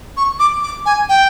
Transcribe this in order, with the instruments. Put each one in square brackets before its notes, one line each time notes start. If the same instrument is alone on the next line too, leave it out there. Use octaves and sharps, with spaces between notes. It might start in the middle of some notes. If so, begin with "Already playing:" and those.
[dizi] C#6
D6
D6
G#5
G5